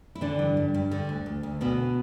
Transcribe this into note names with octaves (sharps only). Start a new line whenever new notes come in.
E4
D3 E3 D4
G2
G2
G2
D3
D2
D2
D2
D2 B2 B3